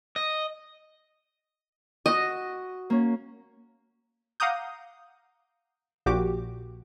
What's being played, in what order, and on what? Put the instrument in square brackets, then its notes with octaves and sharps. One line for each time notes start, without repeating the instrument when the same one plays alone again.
[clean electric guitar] D#5
[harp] F#4 [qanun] D#5
[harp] A#3 C#4
[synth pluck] F5 F#5 A#5 D6 D#6 G6
A#1 A#2 F#4 G4 D6